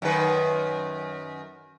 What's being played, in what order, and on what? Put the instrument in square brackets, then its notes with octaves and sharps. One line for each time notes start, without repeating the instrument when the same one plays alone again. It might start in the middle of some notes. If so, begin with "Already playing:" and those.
[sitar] F#2 D#3 B4